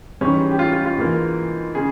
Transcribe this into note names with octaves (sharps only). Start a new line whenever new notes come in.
G#2 E3 G3 C#4
G4
F4
F4
F4
G#2 E3 A#3
C#3 G#4